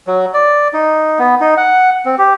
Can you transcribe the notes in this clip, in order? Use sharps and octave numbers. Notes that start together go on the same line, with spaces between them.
F#3
D5
D#4
B3
D#4
F#5
C4
G4